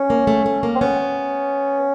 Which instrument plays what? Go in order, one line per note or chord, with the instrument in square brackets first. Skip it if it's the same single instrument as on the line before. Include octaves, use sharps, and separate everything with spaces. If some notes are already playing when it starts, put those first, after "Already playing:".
Already playing: [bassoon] C#4
[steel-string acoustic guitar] A#3
A3
A3
A#3
[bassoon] C4
[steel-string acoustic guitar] B3 [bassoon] C#4